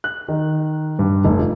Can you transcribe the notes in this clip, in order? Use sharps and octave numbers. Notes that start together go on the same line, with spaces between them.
F#6
D#3
G2
F1
F4